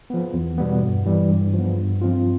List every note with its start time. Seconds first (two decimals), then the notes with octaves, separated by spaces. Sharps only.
0.10 F3 B3
0.33 E2
0.58 B2 G3 B3
0.82 G2
1.05 E3 G3
1.29 G2
1.53 F3 B3
1.78 G2
2.01 F3 C4 F4